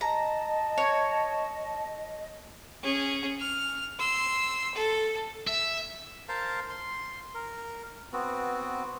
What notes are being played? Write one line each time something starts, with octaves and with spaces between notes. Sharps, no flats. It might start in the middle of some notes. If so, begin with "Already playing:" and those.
D#5 A5 A#5
C#5
C#4 G#4
F6
C6 E6
A4
E5
A#4 C5 F5 A5
C6
A#4
B3 C4 F#4